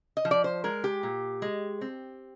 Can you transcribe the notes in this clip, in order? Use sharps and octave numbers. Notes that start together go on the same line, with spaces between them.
D#5
F3
D5
C5
G#3 A#4
G4
A#2
G#3
C4